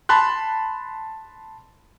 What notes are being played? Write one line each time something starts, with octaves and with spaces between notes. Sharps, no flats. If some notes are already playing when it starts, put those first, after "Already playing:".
A5 B5 C6 F#6